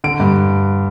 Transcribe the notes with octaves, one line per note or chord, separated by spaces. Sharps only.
D3 D7
G2